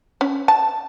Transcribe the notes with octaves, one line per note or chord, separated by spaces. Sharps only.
C#4
A5